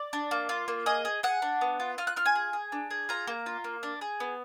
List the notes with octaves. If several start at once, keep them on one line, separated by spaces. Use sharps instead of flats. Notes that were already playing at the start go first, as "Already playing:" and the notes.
Already playing: D5
D4
A#3
F4
A#3
G#4 D#5
G#4
G#4 F#5
D4
B3
F4
F4 F6
F#6
F4 F6
G#5
G#4
G#4
D4
G#4
F4 A#5
A#3
F4
A#3
D4
G#4
B3